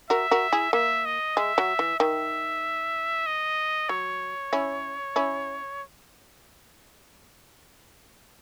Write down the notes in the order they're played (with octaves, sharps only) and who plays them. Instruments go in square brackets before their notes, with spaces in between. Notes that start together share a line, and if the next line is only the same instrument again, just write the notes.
[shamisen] F#4 A#4 [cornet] E5
[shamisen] F#4 A#4
E4 G#4
[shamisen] A#3 [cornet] E5
[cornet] D#5
[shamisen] G#3 [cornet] E5
[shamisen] F#3
E3
[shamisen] D#3 [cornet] E5
[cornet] D#5
[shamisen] F#3 [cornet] C#5
[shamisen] C#4 E4
C#4 E4